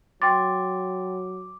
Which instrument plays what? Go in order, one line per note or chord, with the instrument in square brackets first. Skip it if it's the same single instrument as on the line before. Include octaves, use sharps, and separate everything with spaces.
[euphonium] F#3 [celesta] G5 C6 A6 [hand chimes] D6